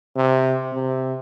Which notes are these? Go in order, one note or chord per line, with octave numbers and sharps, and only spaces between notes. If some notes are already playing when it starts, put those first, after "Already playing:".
C3
C3